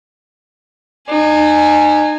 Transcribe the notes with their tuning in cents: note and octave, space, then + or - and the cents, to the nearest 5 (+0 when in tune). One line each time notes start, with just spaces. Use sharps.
D#4 -35 G#5 +0